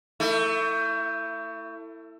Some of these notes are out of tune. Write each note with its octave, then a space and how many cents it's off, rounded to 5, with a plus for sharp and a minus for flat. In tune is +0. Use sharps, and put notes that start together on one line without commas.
A3 +30 E4 +0